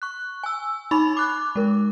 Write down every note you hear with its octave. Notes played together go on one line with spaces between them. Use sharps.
C#6 F#6
G#5 E6
D#4 B5 C#6 A6 F7
D6 F#6
G#3 A#4